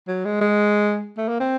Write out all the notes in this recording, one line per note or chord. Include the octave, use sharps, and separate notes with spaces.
F#3
G#3
G#3
A3
A#3
C4